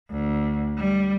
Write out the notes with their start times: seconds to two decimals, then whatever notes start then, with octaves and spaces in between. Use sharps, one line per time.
0.11 D2
0.79 G3